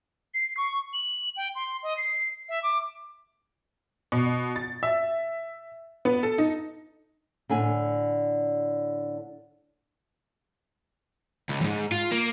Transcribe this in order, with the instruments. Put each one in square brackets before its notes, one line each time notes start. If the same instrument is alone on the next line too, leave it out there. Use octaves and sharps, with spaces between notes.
[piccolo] C7
C#6
F#7
G5
C6
D#5
C7
E5
D6
[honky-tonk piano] B2
A6
E5
B3
A4
D#4
[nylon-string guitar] A2 D3 G#5
[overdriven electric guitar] C#2
F2 G#2
F4
A#3